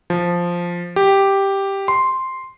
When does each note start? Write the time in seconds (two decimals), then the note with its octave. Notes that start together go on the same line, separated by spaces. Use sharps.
0.10 F3
0.96 G4
1.88 C6